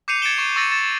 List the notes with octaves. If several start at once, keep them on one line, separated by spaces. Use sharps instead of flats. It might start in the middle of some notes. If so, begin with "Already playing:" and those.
D6 G6 C7 C#7 D#7 F7
G#6 A6 C#7 D7 E7 G7
C#6
C#6 D6 E6 A6 A#6 D#7
A6